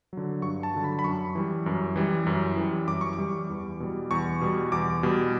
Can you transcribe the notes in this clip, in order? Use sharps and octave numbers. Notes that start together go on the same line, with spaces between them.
D3 F#3
G2 C#6
A5
D3 F#3
B5
B5
F#2 C#6
E3 G3
F#2
E3 G3
F#2
E3 G3
F#2 D6
C#6
D6
E3 G3
E2
B2 G3
E2 C#6
B2 G3
E2 D6
B2 G3